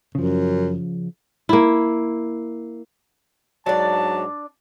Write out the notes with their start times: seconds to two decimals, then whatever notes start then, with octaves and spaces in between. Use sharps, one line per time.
0.15 F#2 C#3 F3
1.49 A#3 E4
3.66 G#2 F#3 D4 D5 A5